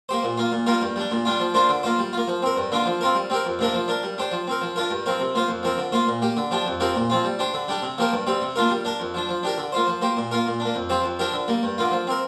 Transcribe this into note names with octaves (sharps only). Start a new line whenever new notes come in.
A#3 G4 C5
A#2
A#3 F4
A#2
G3 A#3 F4 A#4
G2
G3 D4
A#2
G3 D4 F4
F3
A#3 D4 F4 C5
D3
A#3 F4 C5
G3
A#3 F4
F3
C4 A#4
G2
D3 A#3 D4 F4
F3
C4 F4 A#4
G3
C4 G4 A#4
F2
C3 A#3 D4 A#4
F3
D4 A#4
G3
D4 G4 C5
F3
C4 A#4
F3
D4 F4 A#4
G2
F3 C4 A#4
C3
A#3 F4 C5
F2
F3 C4 A#4
D3
A#3 F4 C5
A#2
A#3 G4
D3
F3 D4 G4
F2
F3 C4 G4 A#4
A#2
F3 C4 F4
G3
D4 G4 C5
D3
G3 D4 G4
C3
F3 A#3 G4 A#4
G2
G3 C4 G4
C3
A#3 D4 F4 A#4
G3
D4 A#4
F2
F3 D4
F3
D4 G4 A#4
D3
A#3 F4 C5
F3
A#3 G4 C5
A#2
A#3 F4 A#4
A#2
D4
A#3
F2
F3 C4 G4 C5
F2
F3 D4 G4 A#4
D3
G3 A#3
G2
D3 A#3 F4
F3
C4 A#4